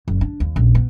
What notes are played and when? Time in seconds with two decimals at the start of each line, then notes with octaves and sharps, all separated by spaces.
0.08 F#1
0.21 D4
0.40 D#2
0.56 D#1 A#1
0.75 B3